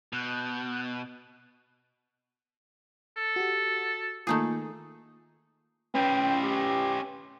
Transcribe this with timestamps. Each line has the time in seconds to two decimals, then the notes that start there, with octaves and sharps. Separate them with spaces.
0.13 B2 F#6 G6
3.17 A4
3.36 F#4 G4
4.27 D#3 A3 A#3 D#4 F4 G#4
5.95 C#4 B4 G5
6.43 G4